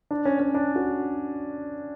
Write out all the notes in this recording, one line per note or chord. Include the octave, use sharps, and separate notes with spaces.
D4
C#4
C#4
D4
F#4